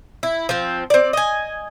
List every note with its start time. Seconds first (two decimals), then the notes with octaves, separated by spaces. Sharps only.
0.23 E4
0.49 F3 C4
0.90 C4 D5
1.13 D#5 G#5